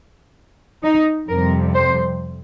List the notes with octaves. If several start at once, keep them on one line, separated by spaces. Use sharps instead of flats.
D#4
F2 C3 G3 A#4
C5